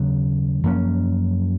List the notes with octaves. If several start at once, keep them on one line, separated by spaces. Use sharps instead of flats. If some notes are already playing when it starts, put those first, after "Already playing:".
Already playing: D#2 C#3 F#3 B3
F#2 F3 A#3 C#4